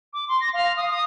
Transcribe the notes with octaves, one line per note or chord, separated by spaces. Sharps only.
D6
C6
A#6
F5
D#6
D#6